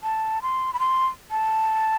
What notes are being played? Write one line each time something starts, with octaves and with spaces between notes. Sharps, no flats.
A5
C6
B5
C6
A5